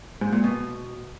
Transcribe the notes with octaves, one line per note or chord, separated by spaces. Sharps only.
G#2
A#2
B2